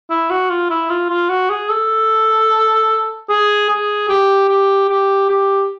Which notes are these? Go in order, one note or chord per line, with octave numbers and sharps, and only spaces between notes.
E4
F#4
F4
E4
F4
F4
F#4
G#4
A4
G#4
G#4
G4
G4
G4
G4